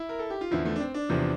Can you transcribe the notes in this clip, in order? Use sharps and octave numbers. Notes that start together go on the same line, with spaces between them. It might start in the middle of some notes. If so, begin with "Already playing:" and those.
Already playing: E4
A#4
A4
G4
F4
E2 D3 F3 E4
A3
D4
C4
D4
E2 C3 F3